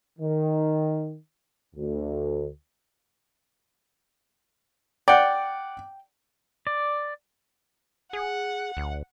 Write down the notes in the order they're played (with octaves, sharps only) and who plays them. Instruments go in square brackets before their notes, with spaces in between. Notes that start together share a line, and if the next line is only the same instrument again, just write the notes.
[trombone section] D#3
D2
[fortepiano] D5 F#5 [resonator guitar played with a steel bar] G5
[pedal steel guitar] D5
[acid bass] G#4 [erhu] F#5
[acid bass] D2